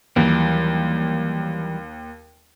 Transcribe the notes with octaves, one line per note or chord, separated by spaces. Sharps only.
D#2 E3 F#3 G3